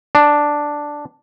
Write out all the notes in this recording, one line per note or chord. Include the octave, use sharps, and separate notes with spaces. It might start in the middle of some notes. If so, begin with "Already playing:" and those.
D4